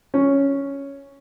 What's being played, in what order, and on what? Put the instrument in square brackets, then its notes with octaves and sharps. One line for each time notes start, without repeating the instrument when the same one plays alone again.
[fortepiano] C#4